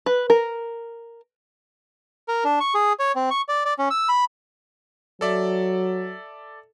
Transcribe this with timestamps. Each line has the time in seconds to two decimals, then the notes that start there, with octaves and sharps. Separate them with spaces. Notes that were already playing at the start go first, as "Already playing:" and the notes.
0.06 B4
0.30 A#4
2.28 A#4
2.44 D4
2.60 C#6
2.75 G#4
2.99 C#5
3.15 C4
3.31 C#6
3.49 D5
3.66 D5
3.79 C#4
3.91 E6
4.09 B5
5.21 F#3 A4 D5 E5